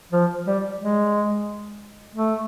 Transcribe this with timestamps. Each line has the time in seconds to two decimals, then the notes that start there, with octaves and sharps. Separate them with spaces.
0.13 F3
0.47 G3
0.80 G#3
2.15 A3